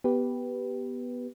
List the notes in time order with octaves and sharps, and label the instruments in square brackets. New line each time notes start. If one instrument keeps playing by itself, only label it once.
[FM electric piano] B3 G4 B4